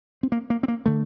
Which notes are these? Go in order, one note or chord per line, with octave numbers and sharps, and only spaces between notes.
C4
A#3
A#3
C4
A#3
D3 A3